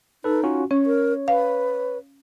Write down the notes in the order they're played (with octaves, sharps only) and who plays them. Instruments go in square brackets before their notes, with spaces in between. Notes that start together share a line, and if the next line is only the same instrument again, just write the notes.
[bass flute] D#4 [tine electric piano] A4 B4
[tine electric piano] C#4 F4 F#4
[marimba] C#4 [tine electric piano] C#5
[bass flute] A#4
[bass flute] B4 [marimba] F5